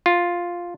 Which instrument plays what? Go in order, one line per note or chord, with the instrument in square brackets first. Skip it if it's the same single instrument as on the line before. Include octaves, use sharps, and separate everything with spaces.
[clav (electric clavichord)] F4